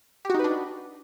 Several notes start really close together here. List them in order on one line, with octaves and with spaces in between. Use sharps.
G4 F#4 D#4 B4 D4